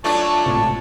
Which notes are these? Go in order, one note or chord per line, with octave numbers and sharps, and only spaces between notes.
F#3 A3 D4 F4 A5 C#6
G#1 A2 C3